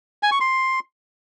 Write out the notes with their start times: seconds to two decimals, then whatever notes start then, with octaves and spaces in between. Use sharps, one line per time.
0.23 G#5
0.32 C#6
0.41 C6